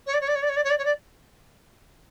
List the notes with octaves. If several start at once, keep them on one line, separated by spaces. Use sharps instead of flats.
C#5
D5
C#5
D5
C#5
D5
C#5
D5
C#5
D5
C#5
D5